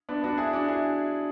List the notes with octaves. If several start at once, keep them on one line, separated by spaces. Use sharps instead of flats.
B3 D4
D4 F#4
E4 G#4
D4 F#4
E4 G#4